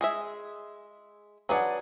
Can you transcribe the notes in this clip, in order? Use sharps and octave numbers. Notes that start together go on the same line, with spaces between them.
G#3 G#4 E5
F#3 D4 G#4 B4 D5 F#5